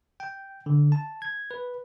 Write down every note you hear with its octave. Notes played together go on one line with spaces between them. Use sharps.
G5
D3
A5
G#6
B4